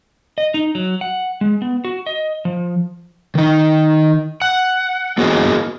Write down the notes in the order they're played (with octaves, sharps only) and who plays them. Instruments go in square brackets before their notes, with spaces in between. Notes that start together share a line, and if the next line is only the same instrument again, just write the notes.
[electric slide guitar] D#5
D#4
F#3
F#5
G#3
B3
F#4
D#5
F3
D#3 D#4
F#5
A#3 B3 F#4 G#4 A#4 D#5